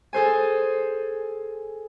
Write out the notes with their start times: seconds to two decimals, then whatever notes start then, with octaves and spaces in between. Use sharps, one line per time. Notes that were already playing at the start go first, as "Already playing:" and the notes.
0.13 G#4 A4 C5 G#5